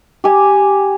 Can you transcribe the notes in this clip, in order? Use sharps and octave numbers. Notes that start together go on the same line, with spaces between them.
G4 G#5